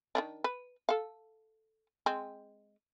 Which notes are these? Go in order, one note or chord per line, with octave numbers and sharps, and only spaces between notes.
D#3 E3 D4
B4
A4 F5
G#3 C4